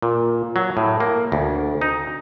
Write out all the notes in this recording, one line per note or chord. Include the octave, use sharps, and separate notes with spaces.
A#2
F#3
A2
A#3
D2
D#4